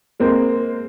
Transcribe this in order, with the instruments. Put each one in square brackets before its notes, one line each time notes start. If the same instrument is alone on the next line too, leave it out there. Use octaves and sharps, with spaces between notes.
[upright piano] G#3 A#3 C4